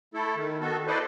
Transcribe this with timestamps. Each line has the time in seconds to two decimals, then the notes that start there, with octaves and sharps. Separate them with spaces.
0.14 A3 E4 A4
0.36 D#3
0.61 D#3 B3 F#4 A4
0.87 E4 A4 B4 C5 D5 D#5